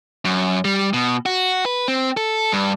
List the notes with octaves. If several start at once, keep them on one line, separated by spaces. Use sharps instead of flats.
F#2
G3
B2
F#4
B4
C4
A4
G2